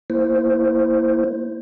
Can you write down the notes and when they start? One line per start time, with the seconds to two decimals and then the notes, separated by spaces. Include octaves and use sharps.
0.10 A#3 E4 C5